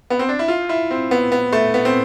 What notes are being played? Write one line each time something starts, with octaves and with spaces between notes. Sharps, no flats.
B3
C4
D4
E4
F4
E4
C4
B3
B3
A3
B3
C4